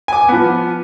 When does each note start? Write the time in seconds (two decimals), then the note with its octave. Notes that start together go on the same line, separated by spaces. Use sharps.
0.08 G#5 D6
0.29 F3 B3